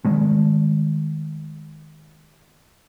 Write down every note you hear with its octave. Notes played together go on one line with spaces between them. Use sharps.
D#3 G#3 A3